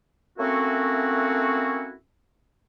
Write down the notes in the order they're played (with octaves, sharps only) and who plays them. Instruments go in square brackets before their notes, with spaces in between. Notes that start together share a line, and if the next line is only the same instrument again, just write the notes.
[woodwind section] A3 A#3 C4 C#4 E4 F#4